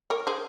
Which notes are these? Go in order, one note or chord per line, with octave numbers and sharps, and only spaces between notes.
A#4 C#5
G#4 C5